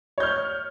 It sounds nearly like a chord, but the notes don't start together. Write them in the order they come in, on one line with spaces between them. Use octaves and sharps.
C#5 G6 F6